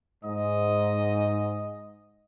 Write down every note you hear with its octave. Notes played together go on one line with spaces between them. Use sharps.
G#2 D#5